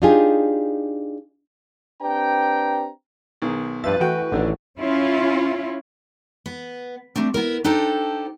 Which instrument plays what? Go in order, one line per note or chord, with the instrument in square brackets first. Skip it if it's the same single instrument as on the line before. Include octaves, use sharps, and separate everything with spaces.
[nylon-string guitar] D4 D#4 F4 G4 G#4
[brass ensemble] C4 D4 G4 B4 G5 A#5
[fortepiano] B1 D#3 G#4
[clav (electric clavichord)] G2 E5 [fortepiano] F3 [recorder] B4 [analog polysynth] A6
[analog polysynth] E3 F#4 [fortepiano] A3 G5 [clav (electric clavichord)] F#5
[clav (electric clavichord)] A1 [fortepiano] D3 D#3 D4
[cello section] C#4 E4 F4
[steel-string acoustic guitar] B3
G3 A3 C4 D4
B3 E4 A#4
D4 D#4 G4 A4 C5